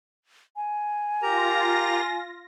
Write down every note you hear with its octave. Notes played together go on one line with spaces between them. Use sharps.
G#5
F4 G4 A#4 A#5 A#6